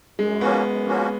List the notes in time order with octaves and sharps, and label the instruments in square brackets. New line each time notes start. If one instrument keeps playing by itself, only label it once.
[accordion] F#2 [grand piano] G#3
[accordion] F3 A#3 C#4 F#4 [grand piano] B3
[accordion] F#2
F3 A#3 C#4 F#4